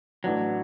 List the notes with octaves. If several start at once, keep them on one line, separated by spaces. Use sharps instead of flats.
A1 A2 E3 F#3 D4